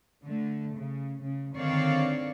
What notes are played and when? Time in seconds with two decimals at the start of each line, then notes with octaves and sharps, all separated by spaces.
0.24 D3 A3
0.75 C#3
1.22 C#3
1.55 D3 D#3 C4 C#5 D5 F5